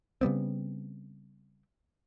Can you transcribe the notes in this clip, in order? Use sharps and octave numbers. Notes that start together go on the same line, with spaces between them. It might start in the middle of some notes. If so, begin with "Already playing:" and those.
C#3 G3 B3 C4